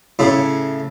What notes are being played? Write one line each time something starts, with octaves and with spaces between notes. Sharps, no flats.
A2 C#3